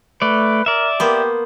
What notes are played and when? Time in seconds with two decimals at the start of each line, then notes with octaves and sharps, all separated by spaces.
0.22 A3 B4 D5
0.66 A#4 D5 E5
1.00 A#3 B3 G4 C5